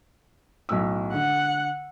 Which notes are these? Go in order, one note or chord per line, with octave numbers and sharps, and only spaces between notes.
B1 A2 E6
D3 F#5